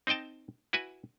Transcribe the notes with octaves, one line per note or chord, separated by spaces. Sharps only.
C4 D#4 D#5 G5 A5
E4 F#4 B4 G#5